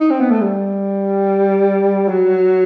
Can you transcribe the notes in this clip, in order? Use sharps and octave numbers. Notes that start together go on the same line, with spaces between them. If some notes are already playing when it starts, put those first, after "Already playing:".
D#4
C4
B3
A3
G3
F#3